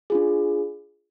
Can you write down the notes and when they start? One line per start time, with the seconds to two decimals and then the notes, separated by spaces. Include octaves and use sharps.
0.10 D4 F4 G#4